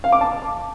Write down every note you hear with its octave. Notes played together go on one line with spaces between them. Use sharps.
F5
D6
A5